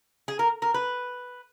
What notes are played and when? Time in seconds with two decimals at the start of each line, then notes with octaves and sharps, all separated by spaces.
0.28 G#4
0.39 A#4
0.62 A#4
0.74 B4